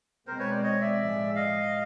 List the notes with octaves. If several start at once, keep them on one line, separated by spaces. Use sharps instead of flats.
B2 G#3 C4 A#4 C5
B4 C#5
C5 D5
C#5 D#5
D5 E5
A2 F3 G#3
D#5 F5